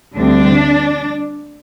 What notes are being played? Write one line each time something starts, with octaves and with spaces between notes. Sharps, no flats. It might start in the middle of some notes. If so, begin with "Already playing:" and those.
D2 D3 G3 C4 D4